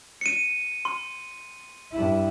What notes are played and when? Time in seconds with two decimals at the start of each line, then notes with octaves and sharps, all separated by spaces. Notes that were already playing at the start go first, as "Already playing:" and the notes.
0.21 C#7 D#7
0.85 C6
1.92 G2 E4